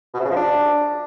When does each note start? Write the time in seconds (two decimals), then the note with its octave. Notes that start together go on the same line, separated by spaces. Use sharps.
0.14 B2
0.20 C3
0.25 C#3
0.31 F3
0.36 D4